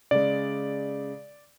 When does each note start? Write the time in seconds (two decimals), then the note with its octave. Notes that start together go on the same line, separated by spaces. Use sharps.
0.11 C#3 G#3 D5